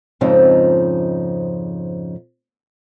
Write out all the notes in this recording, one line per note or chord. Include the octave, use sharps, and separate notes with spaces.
F2 G#2 C#3 F3 C4 D#4